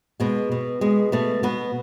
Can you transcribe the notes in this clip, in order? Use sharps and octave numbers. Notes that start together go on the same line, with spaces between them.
B2 G#3
B2
B2 G#3
B2 A3
B2 B3